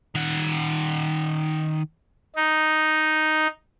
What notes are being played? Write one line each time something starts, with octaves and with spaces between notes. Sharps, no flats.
D#3 F#5
D#4